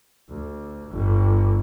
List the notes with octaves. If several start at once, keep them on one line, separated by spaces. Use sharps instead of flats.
D2
G1